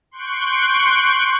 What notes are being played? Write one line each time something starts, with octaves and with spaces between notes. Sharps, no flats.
C6 C#6 F#6 G6 C#7 D7